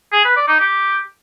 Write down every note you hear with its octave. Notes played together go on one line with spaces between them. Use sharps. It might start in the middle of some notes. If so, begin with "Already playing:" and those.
G#4
B4
D5
D#4
G4